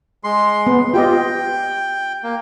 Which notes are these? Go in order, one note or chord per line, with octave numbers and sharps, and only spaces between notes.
G#3 C6
B3
F4 G4 D#5 G5
A#3